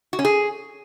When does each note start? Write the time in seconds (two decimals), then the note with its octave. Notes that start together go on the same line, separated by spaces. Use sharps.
0.13 F#4
0.19 C#4
0.25 G#4